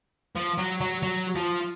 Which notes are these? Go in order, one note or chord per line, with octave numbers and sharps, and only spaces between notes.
F3
F#3
F#3
F#3
F3